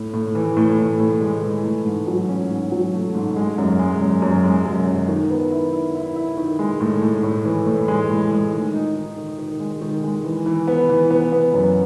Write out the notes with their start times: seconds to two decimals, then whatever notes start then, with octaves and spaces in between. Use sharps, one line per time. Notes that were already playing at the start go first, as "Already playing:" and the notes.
Already playing: A2
0.13 A2
0.35 E3
0.57 A2
0.78 A2
1.00 A2
1.21 G#3
1.43 E3
1.64 A3
1.86 G#2
2.07 F#3
2.29 C#4
2.50 G#2
2.72 F#3
2.93 A3
3.15 G#2
3.36 G#3
3.58 F#2
3.79 G#3
4.01 F#2
4.22 F#2
4.44 G#3
4.65 F#2
4.87 F#2
5.09 D#3
5.30 B3
5.52 E4
5.73 E4
5.95 E4
6.16 E4
6.37 D#3
6.59 G#3
6.81 A2
7.02 A2
7.23 A2
7.45 E3
7.66 A2
7.88 G#3
8.10 A2
8.30 G#3
8.53 D#3
8.73 D#4
8.96 D#3
9.17 D#3
9.38 D#3
9.60 G#3
9.81 D#3
10.03 G#3
10.25 E3
10.46 E3
10.67 B3
10.89 E3
11.10 B3
11.32 B3
11.54 F#2